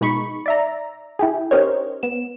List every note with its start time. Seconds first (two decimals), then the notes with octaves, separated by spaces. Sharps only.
0.01 B2 G#3 D#4 B5 C#6
0.46 D5 E5 A#5
1.19 E4 G4 G#4
1.51 C#4 D#4 G4 A#4 C5 C#5
2.03 B3 E7